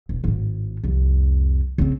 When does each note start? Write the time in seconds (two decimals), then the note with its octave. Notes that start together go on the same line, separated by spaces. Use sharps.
0.09 E1
0.24 G#1 A2
0.84 C2 F2
1.78 C#3 C4